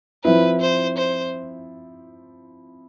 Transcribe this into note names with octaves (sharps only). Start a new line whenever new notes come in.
F3 C4 E4 B4
C5
C5